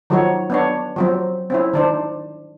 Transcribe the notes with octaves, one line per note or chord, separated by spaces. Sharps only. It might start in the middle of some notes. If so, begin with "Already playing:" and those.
D#3 F3 F#3 D#4 F#4 C#5
B3 D4 C#5
F3 F#3 C4
C4 C#4 E4
D#3 D4 C5